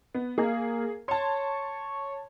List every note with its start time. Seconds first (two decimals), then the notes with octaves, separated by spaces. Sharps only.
0.15 B3
0.38 A#3 G#4 A#4
1.08 C#5 A5 C6